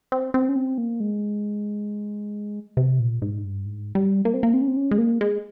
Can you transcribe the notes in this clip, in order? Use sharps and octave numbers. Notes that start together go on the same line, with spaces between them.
C4
C4
C#4
C4
A#3
G#3
C3
A#2
G#2
G2
G#2
G3
A#3
C4
A#3
C4
C#4
C4
C#4
G#3
A#3
G#3